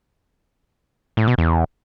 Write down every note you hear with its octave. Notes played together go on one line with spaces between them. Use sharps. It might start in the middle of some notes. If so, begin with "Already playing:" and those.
A2
B2
E2